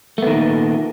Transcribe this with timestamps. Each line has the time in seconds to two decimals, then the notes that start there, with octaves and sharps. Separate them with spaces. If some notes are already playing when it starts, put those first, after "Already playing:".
0.18 A3
0.23 B3
0.27 D#3
0.31 A#2